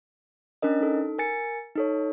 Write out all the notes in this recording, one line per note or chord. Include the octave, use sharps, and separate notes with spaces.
C#4 D4 A#4 D#5
D#4 A4
A#4 G#5 A6 C#7
D#4 A4 C#5